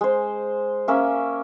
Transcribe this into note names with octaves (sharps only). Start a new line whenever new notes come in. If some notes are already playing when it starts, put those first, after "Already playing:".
G#3 C5
A#3 C#4 E5